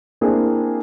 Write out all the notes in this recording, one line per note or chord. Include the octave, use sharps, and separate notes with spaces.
A#3 C4 D4 E4 G#4 A#4